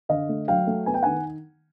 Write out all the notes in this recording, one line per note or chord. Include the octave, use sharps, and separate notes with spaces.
D3 D#5 F5
A3
F#3 F5 G5
A3
B3 G#5
G5
D#3 F#5 G#5